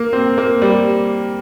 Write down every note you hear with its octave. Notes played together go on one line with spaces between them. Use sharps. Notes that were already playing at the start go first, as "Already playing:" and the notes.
Already playing: A#3
C4
A#3
G3